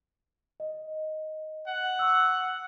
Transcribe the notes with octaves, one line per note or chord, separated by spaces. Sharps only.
D#5
F#5
C#6 E6